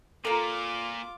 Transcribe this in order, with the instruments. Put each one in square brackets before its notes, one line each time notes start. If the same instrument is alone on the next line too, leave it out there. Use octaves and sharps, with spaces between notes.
[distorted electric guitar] A#2 [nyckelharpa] F4 D6 [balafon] A4 [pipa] A#4 A#5